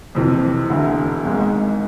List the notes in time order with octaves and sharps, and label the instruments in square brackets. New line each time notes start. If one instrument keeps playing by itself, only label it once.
[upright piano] F2 C3 E3
E1 D2 D3
G#1 G#2 G#3